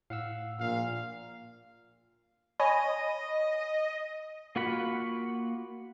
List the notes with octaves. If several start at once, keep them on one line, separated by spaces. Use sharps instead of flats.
A2 F5 F#5 E6
A#1 A#2 F5
C#5 D#5 G#5 B5
A#3 F4 F#4 F#5 B5